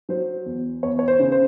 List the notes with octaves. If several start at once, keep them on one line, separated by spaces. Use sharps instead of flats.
F#3 C5
E2
E2 C#5
C#5
C5
C#3
C5